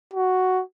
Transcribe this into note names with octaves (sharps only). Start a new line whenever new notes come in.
F#4